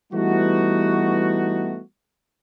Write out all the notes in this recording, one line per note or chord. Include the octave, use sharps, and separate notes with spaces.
E3 G3 A3 B3 D#4 F#4